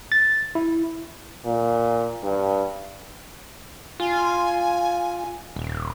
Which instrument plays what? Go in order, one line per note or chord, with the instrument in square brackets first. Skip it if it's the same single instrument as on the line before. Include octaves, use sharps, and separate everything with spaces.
[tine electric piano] A6
E4
[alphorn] A#2
G2
[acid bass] F4 [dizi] G#5
[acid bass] D#1